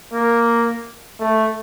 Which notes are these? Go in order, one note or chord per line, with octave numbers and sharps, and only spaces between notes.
A#3
A3